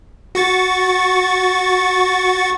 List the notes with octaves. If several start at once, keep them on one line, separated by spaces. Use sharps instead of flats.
F#4 C#6 A6